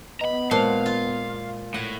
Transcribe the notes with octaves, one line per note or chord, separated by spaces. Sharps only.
B3 D#5 A#5 B5
A#2 G#3 C5 F5 F#5 A5 C6
F4
A2 F#5